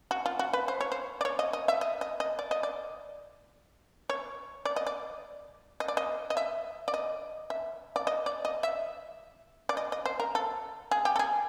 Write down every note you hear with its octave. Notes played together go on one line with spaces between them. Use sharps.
F#4
F4
F#4
B4
C5
C#5
C5
D5
C#5
D#5
D#5
E5
D#5
D#5
D#5
D5
D#5
D5
C#5
D5
D#5
D5
D#5
D5
D#5
D#5
E5
D5
D#5
E5
D5
D#5
D5
D#5
E5
D5
D#5
D#5
C5
A#4
A4
G#4
G4
A4
G#4